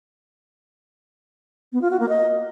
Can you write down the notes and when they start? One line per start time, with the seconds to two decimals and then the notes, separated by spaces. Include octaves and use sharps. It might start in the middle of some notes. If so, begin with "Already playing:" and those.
1.73 B3
1.82 F4
1.91 F#4
2.00 A#3
2.09 D#5